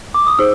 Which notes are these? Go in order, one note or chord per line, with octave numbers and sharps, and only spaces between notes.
D6
D#6
D#4 G#4 C5 E6